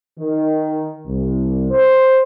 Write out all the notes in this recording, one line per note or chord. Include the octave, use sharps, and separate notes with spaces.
D#3
C2
C5